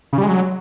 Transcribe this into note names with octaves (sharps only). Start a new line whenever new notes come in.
C#3
G3
G#3
F#3